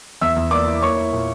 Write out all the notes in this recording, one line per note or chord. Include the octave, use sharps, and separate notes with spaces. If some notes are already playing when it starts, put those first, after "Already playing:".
E2 E5 E6
E2
A#3 D5 D6
E4
A#3 C#5 C#6
E4
A#2